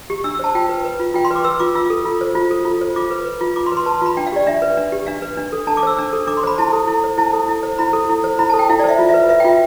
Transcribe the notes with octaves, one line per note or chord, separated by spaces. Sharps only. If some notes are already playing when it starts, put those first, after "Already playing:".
G4
D4 E6
E6
C5 A5
F4 G5
B4
B4
F4
F4 G5
C6
B4
D6
B4 E6
F4 D6
F4 E6
A4
F4
C5
F4
A4
F4
C5
F4 D6
B4
B4
F4
F4 D6
C6
B4
C6
B4 A5
F4 B5
D4 G5
F5
G4 D5
D4 E5
B4
D4
G4
D4 F5
B4
D4
A4
D4 A5
D6
C5 E6
D4
A4
D4 D6
C6
C5 B5
E4 A5
A4
E4
C5
E4 A5
A4
E4
C5
E4 B5
A4
E4
C5
E4 B5
A5
A4
G5
E4 F5
D5
C5 E5
F4
E5
B4
B4 E5
G5
F4 E5